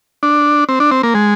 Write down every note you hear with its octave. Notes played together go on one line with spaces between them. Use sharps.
D4
C4
D4
C4
A#3
G#3